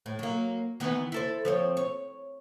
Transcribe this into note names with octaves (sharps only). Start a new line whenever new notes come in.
A2
F#3 A#3
D#3 E3 B3
E4 A4 C5
F3 C4 C#5
C#5